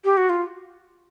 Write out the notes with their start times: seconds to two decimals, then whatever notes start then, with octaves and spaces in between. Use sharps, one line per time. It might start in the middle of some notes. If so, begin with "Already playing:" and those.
0.05 G4
0.17 F#4
0.29 F4